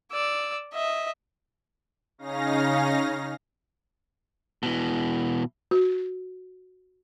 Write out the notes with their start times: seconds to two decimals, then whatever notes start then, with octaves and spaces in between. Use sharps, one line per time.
0.12 D5 E6
0.74 D#5 E5
2.18 C#3 C#4 D#4 F5 A#6
4.63 B2 E3
5.71 F#4